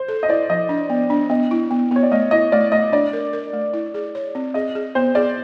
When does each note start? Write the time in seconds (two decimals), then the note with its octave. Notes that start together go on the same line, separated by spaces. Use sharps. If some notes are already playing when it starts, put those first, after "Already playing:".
Already playing: C5
0.09 A4
0.23 D#5
0.29 E4 D5
0.49 F3 D#5
0.69 D4
0.90 B3
1.10 D4
1.30 B3 D#5
1.51 E4
1.71 B3
1.91 B3 C#5
2.03 D5
2.12 A3 D#5
2.31 E4 D#5
2.52 A3 D5
2.72 A3 D#5
2.92 D4 D5
3.13 A#4
3.33 A#4
3.53 A3
3.73 E4
3.94 G#4
4.15 C#5
4.35 C4
4.54 G#4 D#5
4.75 G#4
4.95 B3 C5
5.15 G#4 D5